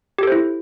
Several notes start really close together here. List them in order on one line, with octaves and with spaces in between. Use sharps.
G4 A4 C5 E4